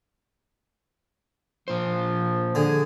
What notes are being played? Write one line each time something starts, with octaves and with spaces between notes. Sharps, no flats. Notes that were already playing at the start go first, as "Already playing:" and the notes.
A#2 F3 C5
D3 G#4